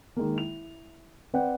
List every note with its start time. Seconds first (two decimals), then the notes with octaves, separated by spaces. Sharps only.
0.17 D#3 G#3 A#3
0.36 E4 F7
1.33 C4 B4 D5 F#5 G5